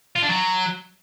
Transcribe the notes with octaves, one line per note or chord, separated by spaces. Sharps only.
F4
D4
F#3